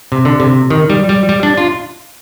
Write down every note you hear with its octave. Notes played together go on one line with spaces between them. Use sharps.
C3
D3
C3
D#3
G3
G3
G3
D4
F4